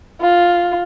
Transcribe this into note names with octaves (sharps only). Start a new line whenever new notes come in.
F4